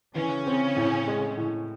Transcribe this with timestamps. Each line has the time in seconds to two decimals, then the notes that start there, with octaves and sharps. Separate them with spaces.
0.15 C#3 E3 C#4
0.47 C4
0.76 A2
1.07 G#3
1.37 A2